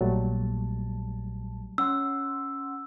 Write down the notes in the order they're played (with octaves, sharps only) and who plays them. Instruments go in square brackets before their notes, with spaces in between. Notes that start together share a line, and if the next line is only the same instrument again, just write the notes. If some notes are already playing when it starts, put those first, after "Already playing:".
[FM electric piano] A#1 A#2 A5 [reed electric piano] F#3 G3 A3
[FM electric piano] C#4 F#5 C6 [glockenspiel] E6